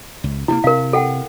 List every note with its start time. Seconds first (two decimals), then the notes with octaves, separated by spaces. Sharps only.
0.24 C#2
0.48 C3 D#3 A#3 E4
0.64 C3 A#4 F5
0.93 A4 F#5 G5